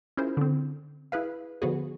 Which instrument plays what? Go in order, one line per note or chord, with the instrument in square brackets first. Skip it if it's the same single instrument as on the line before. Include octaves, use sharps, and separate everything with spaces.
[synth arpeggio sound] C#4 E4 F4 G#4 A#4 C5
D3 C4
E4 G#4 B4 F5
D3 F3 B3 F#4 G#4